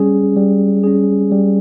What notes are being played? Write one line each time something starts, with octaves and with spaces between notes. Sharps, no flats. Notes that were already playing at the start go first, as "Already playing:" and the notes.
Already playing: G3 C#4 G#4
G3
C#4 G#4
G3